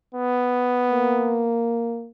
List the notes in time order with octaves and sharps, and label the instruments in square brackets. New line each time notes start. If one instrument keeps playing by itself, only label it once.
[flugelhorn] B3
[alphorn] A#3